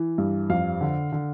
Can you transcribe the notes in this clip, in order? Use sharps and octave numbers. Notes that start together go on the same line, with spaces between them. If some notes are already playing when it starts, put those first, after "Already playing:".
Already playing: E3
G2
F2 F5
D3
D3